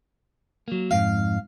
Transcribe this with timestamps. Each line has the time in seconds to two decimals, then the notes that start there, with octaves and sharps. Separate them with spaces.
0.68 F#3 A#3
0.91 F2 G#2 F5